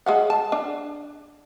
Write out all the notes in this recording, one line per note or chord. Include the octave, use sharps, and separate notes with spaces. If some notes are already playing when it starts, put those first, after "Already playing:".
G#3 F5 F#5
A5
D4